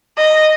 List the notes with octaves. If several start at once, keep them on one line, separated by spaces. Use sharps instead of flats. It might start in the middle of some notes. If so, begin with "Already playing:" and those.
D#5